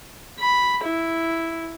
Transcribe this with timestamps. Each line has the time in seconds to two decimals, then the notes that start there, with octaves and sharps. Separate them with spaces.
0.40 B5
0.85 E4